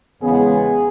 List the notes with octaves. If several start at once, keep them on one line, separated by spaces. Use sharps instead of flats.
E2 C#3 G#3 B3 G#4